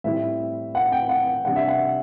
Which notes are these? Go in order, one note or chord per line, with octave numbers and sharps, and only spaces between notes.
A2 G3 C4 E4 E5
F#5
G5
F#5
C3 G3 D4 F#5
E5
F#5